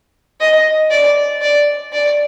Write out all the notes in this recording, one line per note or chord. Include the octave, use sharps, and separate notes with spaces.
D#5
D5
D5
D5